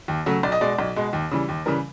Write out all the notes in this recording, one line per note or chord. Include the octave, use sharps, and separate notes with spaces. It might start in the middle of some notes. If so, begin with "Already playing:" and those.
D#2
C#3 F#3 A3
B1 D5
D#5
B2 G#3 D5
B1
B2 G#3
D#2
C#3 E3 G3
D#2
C#3 E3 G3 A#4